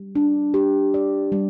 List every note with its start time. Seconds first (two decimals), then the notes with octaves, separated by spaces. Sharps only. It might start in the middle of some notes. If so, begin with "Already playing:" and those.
Already playing: G3
0.15 D4
0.54 G4
0.94 D5
1.32 G3